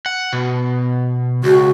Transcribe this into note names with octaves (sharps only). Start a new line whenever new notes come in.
F#5
B2
C#2 F#4